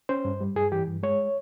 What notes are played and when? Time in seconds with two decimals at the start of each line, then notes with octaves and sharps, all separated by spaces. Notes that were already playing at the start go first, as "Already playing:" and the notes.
0.09 C#4 C5
0.25 G2
0.41 G3
0.56 G2 G#4
0.72 E3 G4
0.88 G2
1.03 G#3 C#5